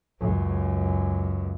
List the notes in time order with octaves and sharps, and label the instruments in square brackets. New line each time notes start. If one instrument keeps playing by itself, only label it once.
[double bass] C#2 F#2